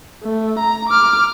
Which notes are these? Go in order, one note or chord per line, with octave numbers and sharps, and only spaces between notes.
A3
A#5
D6 F6